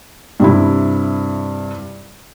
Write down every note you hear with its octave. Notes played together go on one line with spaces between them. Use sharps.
G2 C3 E4